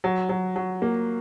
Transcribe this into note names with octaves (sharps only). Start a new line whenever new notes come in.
F#3
F#3
F#3
A#3